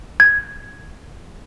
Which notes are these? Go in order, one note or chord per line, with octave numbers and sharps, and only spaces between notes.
G#6